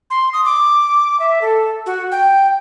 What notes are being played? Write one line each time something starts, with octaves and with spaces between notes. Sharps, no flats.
C6
D#6
D6
E5
A4
F#4
G5